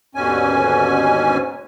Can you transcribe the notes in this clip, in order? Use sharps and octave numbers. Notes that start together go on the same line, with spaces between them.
D#2 G#2 B2 D3 C#4 G#5